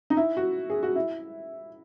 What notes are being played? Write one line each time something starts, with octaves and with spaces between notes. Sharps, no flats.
D#4
E4
F#4
G#4
F#4
E4